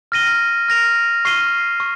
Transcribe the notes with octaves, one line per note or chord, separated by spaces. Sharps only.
F6 A#6 D#7 G7
F6 A#6 F7
C#6 F6 C7 D#7 G7
C#6